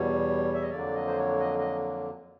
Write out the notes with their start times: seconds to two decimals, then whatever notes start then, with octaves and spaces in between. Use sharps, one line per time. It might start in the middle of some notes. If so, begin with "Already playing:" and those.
Already playing: E2 B2 G3 C#5
0.54 E5
0.62 D#5
0.70 F2 D3 F#3 A#3 D5
0.95 D#5
1.07 C5
1.17 C#5
1.40 D#5
1.59 D#5